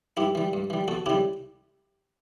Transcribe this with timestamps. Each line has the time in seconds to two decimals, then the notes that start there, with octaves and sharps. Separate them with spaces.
0.17 G2 E4 G4
0.35 E3 G3
0.53 G2
0.70 E3 G3
0.88 E2 F#4 A4
1.06 C#3 G3 E4 G4